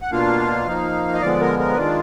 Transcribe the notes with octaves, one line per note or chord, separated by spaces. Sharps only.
F#5
B2 A#3 D4 F4 F5
F3 A#3 D#4
D#5
D3 F3 G#3 B3 D5
A#4
A#4
B4
D#3 G#3 D4 F4 D5